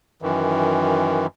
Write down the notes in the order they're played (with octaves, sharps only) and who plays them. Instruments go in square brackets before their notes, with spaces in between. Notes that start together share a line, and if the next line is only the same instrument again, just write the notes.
[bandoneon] F#2 D#3 E3